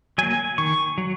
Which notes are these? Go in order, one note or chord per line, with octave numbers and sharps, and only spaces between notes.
F#3 A#3 G#5
D#3 C#6
F#3